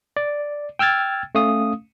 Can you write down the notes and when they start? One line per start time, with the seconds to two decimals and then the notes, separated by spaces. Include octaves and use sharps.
0.17 D5
0.79 G5 E6 F6 G#6 A6
1.35 A3 C#4 F5 D#6